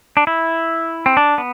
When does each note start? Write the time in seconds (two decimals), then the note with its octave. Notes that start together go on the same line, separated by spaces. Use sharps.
0.17 D4
0.27 E4
1.06 C4
1.17 D4
1.38 B3